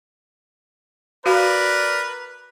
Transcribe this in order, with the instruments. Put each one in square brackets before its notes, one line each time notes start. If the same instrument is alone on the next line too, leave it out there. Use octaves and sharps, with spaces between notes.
[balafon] F#4 F5 [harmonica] A#4 D5 [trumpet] B4